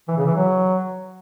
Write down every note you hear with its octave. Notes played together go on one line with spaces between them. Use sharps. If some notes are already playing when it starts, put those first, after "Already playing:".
E3
C#3
E3
F#3